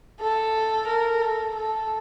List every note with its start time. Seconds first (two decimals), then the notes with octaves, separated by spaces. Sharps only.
0.21 A4
0.88 A#4
1.23 A4
1.56 A4